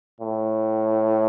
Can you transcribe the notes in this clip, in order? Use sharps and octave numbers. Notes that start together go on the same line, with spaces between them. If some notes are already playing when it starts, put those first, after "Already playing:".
A2